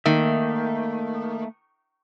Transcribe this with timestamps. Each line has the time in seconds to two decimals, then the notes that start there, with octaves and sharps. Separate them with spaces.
0.06 D#3 A3 A#3 E5